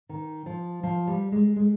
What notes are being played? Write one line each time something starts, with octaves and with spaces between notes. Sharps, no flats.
D#3
F3
F3
G3
G#3
G#3